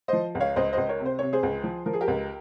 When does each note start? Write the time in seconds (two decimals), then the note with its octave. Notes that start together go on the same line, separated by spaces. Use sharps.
0.08 F3 C5 D#5
0.35 C#2
0.40 C#5 F5
0.56 C#2 C5 D#5
0.73 C#2 C5 D#5
0.89 A#4 C#5
1.00 C3
1.05 C5
1.19 C3 C#5
1.33 G#4 C5
1.43 C#2
1.64 F3
1.86 F3 A#4
1.93 G#4
2.01 G4 A#4
2.08 C#2